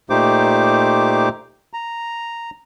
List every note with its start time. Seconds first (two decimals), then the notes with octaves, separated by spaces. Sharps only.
0.10 A#2 A3 D#4 G4 C5 D6
1.73 A#5